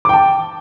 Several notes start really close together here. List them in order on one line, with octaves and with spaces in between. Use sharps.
D6 G5 A5